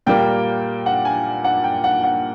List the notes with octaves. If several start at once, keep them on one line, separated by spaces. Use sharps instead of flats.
A#2 G3 A#3 G5
F#5
G#5
F#5
G5
F#5
F#5